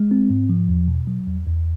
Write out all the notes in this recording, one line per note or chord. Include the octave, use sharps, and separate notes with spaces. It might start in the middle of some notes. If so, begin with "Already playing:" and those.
Already playing: G#3
C4
G#2
F3
E2
B2
F#3
E2
E2